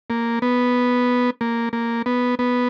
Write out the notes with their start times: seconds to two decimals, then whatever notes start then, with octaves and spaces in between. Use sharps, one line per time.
0.10 A#3
0.42 B3
1.41 A#3
1.73 A#3
2.06 B3
2.39 B3